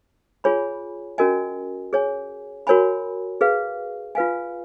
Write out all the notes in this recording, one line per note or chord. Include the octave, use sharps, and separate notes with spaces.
F4 G#4 C#5 G#5 B5
C#4 F#4 A#4 D#5 G#5
G#4 C#5 G#5
F#4 A#4 C#5 G#5 B5
G#4 B4 F5
F4 B4 F5 G#5